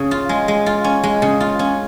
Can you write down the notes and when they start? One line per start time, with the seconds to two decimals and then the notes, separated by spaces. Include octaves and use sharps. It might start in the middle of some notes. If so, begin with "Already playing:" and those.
Already playing: C#3 C#4
0.11 F4
0.29 G#3
0.48 G#3
0.66 F4
0.84 C#4
1.03 G#3
1.22 C#3
1.40 F4
1.59 C#4